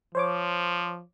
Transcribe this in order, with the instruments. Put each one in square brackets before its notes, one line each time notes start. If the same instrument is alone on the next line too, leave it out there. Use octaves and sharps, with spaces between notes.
[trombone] F3 [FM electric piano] C5 C#5 D6